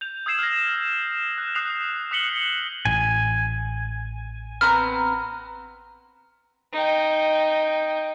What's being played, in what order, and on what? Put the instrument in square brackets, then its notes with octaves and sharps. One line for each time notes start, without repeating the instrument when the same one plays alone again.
[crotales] G6 F7
D#6 E6 G#6 C7 E7
F6 A#6
F#6
D#6 F#6 C7 F7
D#6 F#6 B6 C#7 F#7 G7
[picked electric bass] A1 [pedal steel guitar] G#5
[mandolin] B3 C4 A#5 [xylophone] F6
[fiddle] D#4 G5